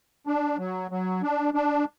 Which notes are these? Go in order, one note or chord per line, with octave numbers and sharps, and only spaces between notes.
D4
F#3
F#3
D4
D4